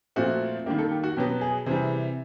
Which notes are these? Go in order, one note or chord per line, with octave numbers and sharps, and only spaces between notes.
A#2 F3 A3 C4 F#4
D#3 G3 A#3 G4
A4
G4
F#4
B2 F#3 B3 G4
G#4
C3 E3 G3 G#4